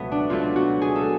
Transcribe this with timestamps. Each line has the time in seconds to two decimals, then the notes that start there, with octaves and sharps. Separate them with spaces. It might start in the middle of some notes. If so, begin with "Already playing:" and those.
Already playing: C#2 B2 F#3 A3 B3
0.12 D4
0.30 C#2 B2 F#3 A3 F4
0.56 F#4
0.82 G#4
0.96 A4